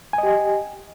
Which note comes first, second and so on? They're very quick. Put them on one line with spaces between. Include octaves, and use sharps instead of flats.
G#5 D#5 G4